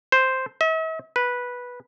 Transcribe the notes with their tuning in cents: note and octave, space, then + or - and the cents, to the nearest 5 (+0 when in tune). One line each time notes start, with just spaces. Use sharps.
C5 +0
E5 -45
B4 -10